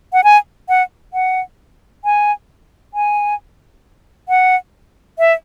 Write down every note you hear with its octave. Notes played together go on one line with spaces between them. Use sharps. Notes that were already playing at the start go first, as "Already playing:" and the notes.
F#5
G#5
F#5
F#5
G#5
G#5
F#5
E5